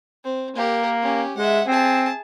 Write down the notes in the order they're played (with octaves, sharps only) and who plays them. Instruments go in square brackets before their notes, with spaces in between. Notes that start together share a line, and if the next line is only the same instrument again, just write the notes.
[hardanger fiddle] C4
[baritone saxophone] A#3 [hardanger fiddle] G4 A#4
[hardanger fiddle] C#4 G4
[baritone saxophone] G#3 [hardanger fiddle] E5 F#5
[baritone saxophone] C4 [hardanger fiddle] G#4 A5